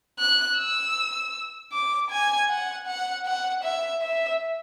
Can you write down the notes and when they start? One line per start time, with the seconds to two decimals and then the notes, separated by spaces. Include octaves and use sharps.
0.19 F#6
0.58 E6
1.72 D6
2.11 G#5
2.49 F#5
2.87 F#5
3.26 F#5
3.64 E5
4.02 E5